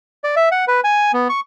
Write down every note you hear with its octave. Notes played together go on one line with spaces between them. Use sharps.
D5
E5
F#5
B4
G#5
B3
C#6